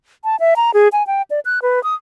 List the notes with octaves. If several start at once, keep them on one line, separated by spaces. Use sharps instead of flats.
A5
E5
A#5
G#4
G#5
G5
D5
F#6
B4
D#6